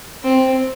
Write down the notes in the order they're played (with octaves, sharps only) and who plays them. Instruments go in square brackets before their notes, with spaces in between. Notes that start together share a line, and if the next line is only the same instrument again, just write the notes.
[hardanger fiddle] C4